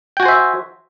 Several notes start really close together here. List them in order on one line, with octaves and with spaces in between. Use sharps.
G5 F#4 G#5 C5 E5